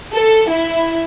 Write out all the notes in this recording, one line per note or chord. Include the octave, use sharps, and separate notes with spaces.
A4
E4